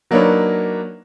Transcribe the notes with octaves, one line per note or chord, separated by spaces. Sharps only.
F#3 A#3 D4 D#4 B4 C#5